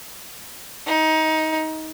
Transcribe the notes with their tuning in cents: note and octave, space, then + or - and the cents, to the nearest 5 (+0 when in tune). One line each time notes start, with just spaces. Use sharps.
D#4 +20